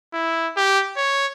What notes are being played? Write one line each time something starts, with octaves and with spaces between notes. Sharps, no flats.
E4
G4
C#5